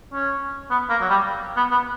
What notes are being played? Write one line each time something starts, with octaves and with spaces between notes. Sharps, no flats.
C#4
B3
A#3
F#3
G3
B3
B3